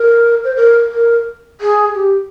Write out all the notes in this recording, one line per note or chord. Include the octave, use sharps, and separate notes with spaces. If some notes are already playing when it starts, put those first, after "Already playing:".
Already playing: A#4
C5
A#4
A#4
G#4
G4